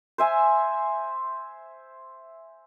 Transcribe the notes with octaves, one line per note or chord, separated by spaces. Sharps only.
C5 E5 G#5